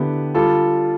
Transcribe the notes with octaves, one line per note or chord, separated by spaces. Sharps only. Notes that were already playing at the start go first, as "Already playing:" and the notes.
Already playing: D3 B3 E4 G4
G3 F4 A4